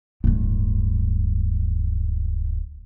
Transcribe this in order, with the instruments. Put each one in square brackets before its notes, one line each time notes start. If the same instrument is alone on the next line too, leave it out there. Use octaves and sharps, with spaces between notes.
[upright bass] D1 G2